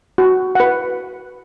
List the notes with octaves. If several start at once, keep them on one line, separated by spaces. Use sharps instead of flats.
F#4
B4 F#5